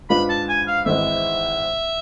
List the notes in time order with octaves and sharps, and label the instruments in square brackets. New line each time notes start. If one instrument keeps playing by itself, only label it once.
[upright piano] G#2 G#3 D4 F4 B4 [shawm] B5
[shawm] A5
G#5
F5
[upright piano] G#1 G#2 E3 G#3 C4 [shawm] E5